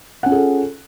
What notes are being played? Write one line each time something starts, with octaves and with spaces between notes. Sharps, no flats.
C#4 F4 G#4 A4 F#5